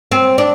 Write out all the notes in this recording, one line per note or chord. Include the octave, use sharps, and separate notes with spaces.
C4
D4